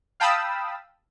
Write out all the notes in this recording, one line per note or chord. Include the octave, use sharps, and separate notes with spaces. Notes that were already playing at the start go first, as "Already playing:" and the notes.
F5 G5 A5 B5 D#6 E6